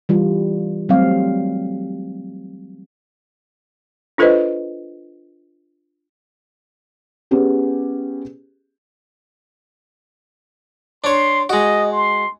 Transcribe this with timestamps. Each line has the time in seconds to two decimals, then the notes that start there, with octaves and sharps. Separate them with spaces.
0.09 E3 G3 F4
0.89 F#3 G3 A3 C4 F5
4.18 D4 F4 A4 B4 C5 D#5
7.31 B3 C#4 G4 G#4
11.04 D4 C#5 C6
11.49 G#3 F#4 D#5
11.93 C6